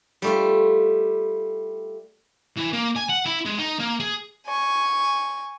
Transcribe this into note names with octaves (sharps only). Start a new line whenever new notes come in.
G3 A3 F4
E3
A#3
G#5
F#5
E4
G#3
D#4
A#3
G#4
G#5 C#6